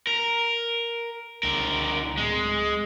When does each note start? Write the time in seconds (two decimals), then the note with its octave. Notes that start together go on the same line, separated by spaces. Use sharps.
0.07 A#4
1.43 C#2 D3 A#4
2.18 D1 G#3